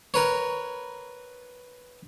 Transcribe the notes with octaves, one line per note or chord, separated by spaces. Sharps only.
A#4 B4 C#5